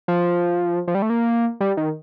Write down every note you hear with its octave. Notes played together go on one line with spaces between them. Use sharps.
F3
F3
G3
A3
A#3
G3
D#3